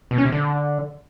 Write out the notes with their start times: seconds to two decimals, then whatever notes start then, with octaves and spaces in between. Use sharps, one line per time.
0.11 B2
0.18 C#4
0.25 C3
0.32 D3